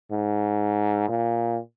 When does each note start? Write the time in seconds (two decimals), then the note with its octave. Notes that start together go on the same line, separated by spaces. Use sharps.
0.11 G#2
1.09 A#2